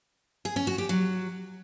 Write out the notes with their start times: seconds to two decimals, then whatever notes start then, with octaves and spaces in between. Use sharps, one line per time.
0.45 G#4
0.56 C#4
0.67 F#4
0.78 G4
0.89 F#3